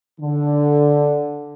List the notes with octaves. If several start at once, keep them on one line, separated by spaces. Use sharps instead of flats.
D3